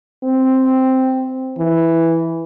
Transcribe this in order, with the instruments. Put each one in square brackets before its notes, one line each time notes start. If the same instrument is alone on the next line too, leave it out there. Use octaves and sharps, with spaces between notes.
[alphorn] C4
E3